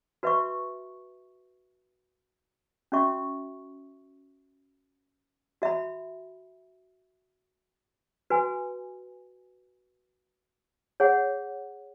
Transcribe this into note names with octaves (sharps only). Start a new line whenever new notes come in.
F#4 B4 E5 C#6
C#4 F#4 E5 C#6
F#4 E5 B5
F#4 B4 G#5
G#4 C#5 F#5